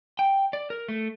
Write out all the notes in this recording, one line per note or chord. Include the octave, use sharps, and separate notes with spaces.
G5
D5
A#4
A3